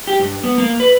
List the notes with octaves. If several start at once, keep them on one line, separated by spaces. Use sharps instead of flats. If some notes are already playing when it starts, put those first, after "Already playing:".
G4
G2
B3
A#3
B4